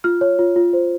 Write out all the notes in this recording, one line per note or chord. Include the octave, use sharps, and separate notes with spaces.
F4 F6
C#5
F4
F4
C5